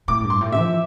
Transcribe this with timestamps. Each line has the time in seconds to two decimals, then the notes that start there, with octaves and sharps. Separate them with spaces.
0.08 A2 D6
0.24 G2
0.30 C6
0.41 A2
0.52 E5
0.57 F3